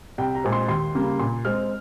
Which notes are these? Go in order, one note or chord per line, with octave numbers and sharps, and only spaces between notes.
C2 G5
A#5
A#2 G#3 C4
C6
D#2 C6
C#3 G3 A#3
A#2 C6
G#3 C4 F6